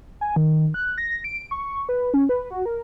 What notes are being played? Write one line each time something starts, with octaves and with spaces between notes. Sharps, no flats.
G#5
D#3
F#6
A#6
D7
C#6
B4
C#4
B4
F#4
A#4